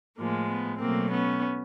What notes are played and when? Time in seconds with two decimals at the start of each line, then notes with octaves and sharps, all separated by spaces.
0.18 A2 F3 G#3 A#3
0.49 B3
0.80 B2 F#3 A3 A#3 C4
1.10 B3 C#4